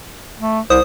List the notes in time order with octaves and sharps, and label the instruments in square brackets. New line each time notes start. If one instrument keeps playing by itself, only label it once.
[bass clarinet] A3
[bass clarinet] C2 [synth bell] C5 D#6